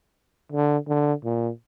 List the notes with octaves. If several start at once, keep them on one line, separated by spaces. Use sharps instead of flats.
D3
D3
A#2